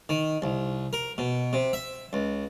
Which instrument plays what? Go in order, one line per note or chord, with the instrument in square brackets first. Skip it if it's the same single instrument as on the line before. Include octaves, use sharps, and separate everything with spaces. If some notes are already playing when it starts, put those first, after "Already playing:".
[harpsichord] D#3
C2
A#4
B2
C3
E5
C#2